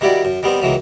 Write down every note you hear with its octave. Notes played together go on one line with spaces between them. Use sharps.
D#3 G3 E4 F#4 D5
F#2
D#3 G3 B3 C4
C#2 D#3 E3 F#3